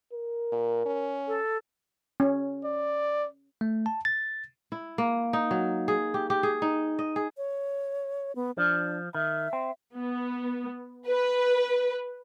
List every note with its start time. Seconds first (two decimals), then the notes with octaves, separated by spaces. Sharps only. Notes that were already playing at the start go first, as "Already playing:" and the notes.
0.13 A#4
0.52 A#2
0.86 C#4
1.27 A4
2.20 C#4
2.65 D5
3.61 A3
3.86 A5
4.05 A6
4.72 E4
4.98 A#3
5.33 D#4
5.51 F#3
5.88 G#4
6.14 G4
6.30 G4
6.43 G#4
6.62 D#4
6.99 D#5
7.16 G#4
7.37 C#5
8.36 B3
8.58 F3 D4
9.15 D#3 E5
9.53 C4
9.96 B3
11.08 B4